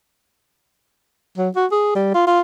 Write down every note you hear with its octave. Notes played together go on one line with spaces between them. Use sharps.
F#3
F#4
G#4
G3
F4
F4